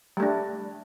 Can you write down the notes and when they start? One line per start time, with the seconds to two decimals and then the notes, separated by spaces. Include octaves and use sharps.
0.17 G3
0.20 A3
0.23 D4